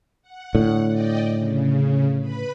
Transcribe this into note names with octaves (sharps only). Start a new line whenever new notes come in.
F#5
A2 D3
D5 D#5 G5
C#3
B4 B5